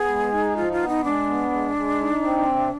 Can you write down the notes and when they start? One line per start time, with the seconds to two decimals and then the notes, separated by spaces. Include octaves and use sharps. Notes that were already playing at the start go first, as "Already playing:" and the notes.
Already playing: B3 G#4
0.09 G#3
0.33 D#4
0.57 F3 F4
0.73 F4
0.81 B3
0.88 D#4
1.04 G#3 D4
1.28 B3
1.52 G#3
1.76 G#3
2.00 D#4
2.23 C4
2.47 C3